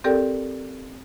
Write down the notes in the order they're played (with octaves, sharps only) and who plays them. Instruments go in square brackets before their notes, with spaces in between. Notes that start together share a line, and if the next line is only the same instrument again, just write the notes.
[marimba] C4 G4 A4 A#4 D5 G5